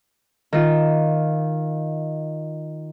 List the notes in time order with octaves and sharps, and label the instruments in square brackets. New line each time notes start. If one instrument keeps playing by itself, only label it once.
[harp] D#3 F4